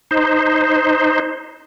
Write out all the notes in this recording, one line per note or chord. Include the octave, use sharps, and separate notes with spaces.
D#4 C5